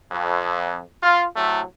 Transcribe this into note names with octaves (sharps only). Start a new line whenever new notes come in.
F2
F4
A2 C3 F#3 A3